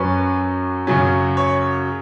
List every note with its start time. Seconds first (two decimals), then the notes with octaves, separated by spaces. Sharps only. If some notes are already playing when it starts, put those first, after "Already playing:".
Already playing: F#2 F#3 C#4 B4
0.87 F#2 C#3 F#3 C#4
1.37 C#5